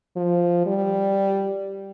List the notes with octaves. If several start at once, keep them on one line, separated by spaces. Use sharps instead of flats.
F3
G3